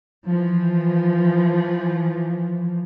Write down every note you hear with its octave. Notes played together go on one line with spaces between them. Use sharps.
E3 F3